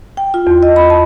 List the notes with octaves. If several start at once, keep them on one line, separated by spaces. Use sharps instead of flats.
G5
F4
E2
D#5
B5
A5